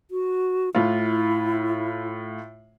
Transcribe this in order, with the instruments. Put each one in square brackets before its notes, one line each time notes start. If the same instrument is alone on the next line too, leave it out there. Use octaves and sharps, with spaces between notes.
[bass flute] F#4
[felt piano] A2 F4 [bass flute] E4